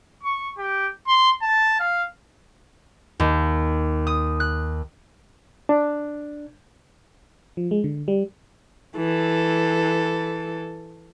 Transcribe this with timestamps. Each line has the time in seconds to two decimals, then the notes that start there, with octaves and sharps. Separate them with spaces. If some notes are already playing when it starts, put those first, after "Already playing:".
0.23 C#6
0.58 G4
1.07 C6
1.42 A5
1.79 F5
3.20 D#2
4.07 D#6
4.40 F#6
5.69 D4
7.57 F3
7.71 G#3
7.84 D3
8.08 G3
8.96 E3 A4